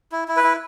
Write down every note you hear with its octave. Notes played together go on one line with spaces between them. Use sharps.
E4
E4
B4
E4